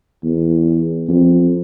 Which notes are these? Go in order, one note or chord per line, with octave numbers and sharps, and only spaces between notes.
E2
F2